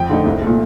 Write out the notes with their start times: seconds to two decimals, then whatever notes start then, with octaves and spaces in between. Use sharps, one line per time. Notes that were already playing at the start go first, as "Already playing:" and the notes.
Already playing: F2 G5
0.09 D3 A3 D#4
0.26 C2
0.42 A#2 A3